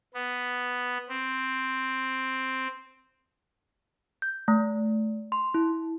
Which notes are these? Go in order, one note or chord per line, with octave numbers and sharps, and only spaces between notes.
B3
C4
G6
A3
C6
E4